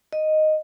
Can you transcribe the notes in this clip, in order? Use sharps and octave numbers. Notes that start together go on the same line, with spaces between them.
D#5